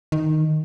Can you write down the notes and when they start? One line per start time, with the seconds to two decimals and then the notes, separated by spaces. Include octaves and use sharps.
0.12 D#3